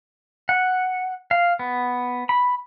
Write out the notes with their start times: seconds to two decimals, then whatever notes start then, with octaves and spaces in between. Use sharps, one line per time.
0.49 F#5
1.31 F5
1.59 B3
2.29 B5